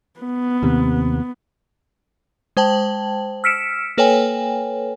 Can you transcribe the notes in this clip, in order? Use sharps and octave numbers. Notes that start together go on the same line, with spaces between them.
B3
D#2 C3
G#3 C5 G5 A5 F#7
E6 F6 B6 C#7 D7 E7
A#3 A4 B4 C#5 G5 G#5